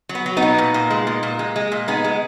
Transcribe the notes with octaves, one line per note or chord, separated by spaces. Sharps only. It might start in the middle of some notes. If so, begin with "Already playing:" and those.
F#3
B3
F#3
B3 D#4
B2
A#2
A#2
G#3
A#2
A#2
G#3
G#3
A#2
G#3 B3 D#4
G#3